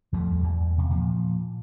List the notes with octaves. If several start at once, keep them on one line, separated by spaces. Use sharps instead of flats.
E2 F3 G3 A3
E2
C3
A#2 F3